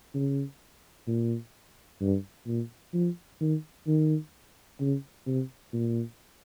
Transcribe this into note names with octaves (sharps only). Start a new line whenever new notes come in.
C#3
A#2
G2
A#2
F3
D#3
D#3
C#3
C3
A#2